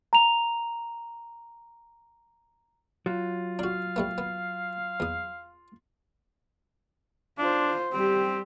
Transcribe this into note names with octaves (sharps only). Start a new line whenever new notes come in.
A#5 F7
F#3 F4
D4 F#4 F5
G3 A3 B3
B3
E2 D#6
D4 F4 C5
G3 C4 G4